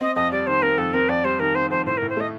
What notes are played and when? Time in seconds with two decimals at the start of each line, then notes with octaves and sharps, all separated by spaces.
0.01 C4 D#5
0.16 F2 D#5
0.31 G3 D5
0.47 D#3 C5
0.62 C4 A#4
0.78 F2 A4
0.94 C4 A#4
1.09 F2 D5
1.24 G3 C5
1.40 D#3 A#4
1.55 C4 C5
1.70 F2 C5
1.86 A2 C5
1.97 A2 A#4
2.09 C5
2.17 A3 D#5